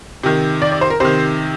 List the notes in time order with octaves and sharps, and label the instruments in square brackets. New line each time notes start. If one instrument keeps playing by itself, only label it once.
[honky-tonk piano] C3 D#3
D5
D5
C5
A#4
C3 D#3 C5